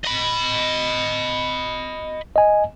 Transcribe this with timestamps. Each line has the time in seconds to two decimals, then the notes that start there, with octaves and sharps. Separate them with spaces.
0.05 D#5 B5
2.36 D#5 G#5